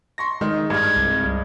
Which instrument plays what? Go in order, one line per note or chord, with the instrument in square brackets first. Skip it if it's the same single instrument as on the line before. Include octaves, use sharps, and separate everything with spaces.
[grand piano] C6 C#6 A#6
[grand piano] D#3 [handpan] G#3 D#5
[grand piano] G2 D#4 F6 [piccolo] G#6
[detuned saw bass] C2